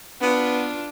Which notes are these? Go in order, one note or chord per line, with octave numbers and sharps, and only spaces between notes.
B3 D4 F4